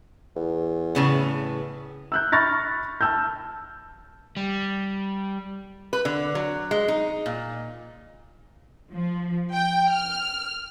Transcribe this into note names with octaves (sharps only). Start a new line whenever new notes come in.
E2
A2 C#3 B3
E6 F#6 G6
B5 C#6 F6 A6 A#6
A5 E6 F6 G6
G3
B4
D3
F#3
G#3
D#4
A#2
F3
G5
F6